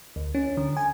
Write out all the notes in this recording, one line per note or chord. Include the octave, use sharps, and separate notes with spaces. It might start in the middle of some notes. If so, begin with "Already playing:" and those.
D2
C#4
D3
G#5